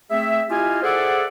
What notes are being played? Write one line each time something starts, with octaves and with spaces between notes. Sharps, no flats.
A3 C4 G#4 E5
E4 F4 G4 D#5 F5 G#5
G#4 A4 C5 D5 E5 F#5